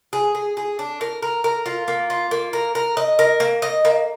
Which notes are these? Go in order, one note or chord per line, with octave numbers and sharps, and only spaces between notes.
G#4
G#4
G#4
D4
A#4
A#4
A#4
F4
A#3
F4
A#3
A#4
A#4
D#5
A#4
A#3
D#5
A#3